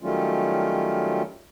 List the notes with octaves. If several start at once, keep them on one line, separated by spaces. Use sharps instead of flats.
D#3 F#3 G3 A3 C#4 F4